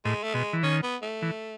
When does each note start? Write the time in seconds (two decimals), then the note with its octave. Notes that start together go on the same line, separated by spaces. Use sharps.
0.05 A2 G#3
0.23 A3
0.34 B2 G#3
0.53 E3
0.63 D#3 C#4
0.83 B3
1.02 A3
1.22 E3